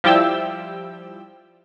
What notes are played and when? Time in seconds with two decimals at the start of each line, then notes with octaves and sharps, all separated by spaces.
0.04 F3 G3 E4 G4 G5 E6